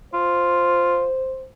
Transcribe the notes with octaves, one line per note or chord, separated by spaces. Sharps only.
F4 C5